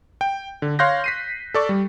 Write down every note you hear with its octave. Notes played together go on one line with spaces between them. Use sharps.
G5
D3
C#5 F5 C6 F#6 G6 A#6
B6 C7 D#7
A4 D5 C#6
G3